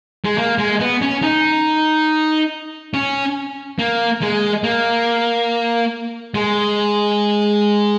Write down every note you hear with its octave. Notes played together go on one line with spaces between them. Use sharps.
G#3
A#3
G#3
B3
C#4
D#4
C#4
A#3
G#3
A#3
G#3